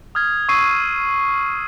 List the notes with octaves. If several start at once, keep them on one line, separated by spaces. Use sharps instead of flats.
D#6 F6 G#6
C#6 D#6 E6 C7 D#7